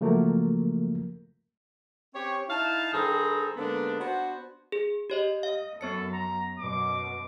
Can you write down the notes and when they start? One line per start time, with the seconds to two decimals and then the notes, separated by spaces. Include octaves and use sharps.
0.01 C#3 F3 F#3 A3 A#3 A#4
2.14 C4 C#4 G4 C#5
2.49 D#4 E4 F5 A5
2.93 G2 D#3 G#4 A4 C5 A#5
3.56 D3 G#3 A#3 B3 D4 D#4
3.99 B3 D4 F#4 C5
4.72 G#4
5.10 G4 C#5 D#5
5.43 D#5 F5
5.81 F#2 B3 A4 C#5 C#7
6.12 A#5
6.59 F#2 B2 D6